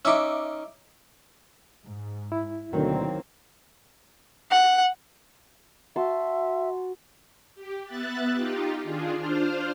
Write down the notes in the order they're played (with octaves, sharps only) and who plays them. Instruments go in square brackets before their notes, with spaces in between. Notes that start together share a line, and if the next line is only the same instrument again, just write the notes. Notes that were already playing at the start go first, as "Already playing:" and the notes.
[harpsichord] C#4 D#4 [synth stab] E5 D6
[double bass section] G#2
[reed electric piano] E4
[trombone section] D2 B2 D3 [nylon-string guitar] D#3 F#3 [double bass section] A#3 C4
[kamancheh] F#5
[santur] F#4 A5 C6 [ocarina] E5
[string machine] G4
B3 E5 F#6 A6
D#4 F4 G4
D#3 D4 F4 G#4
D4 F4 C5 F5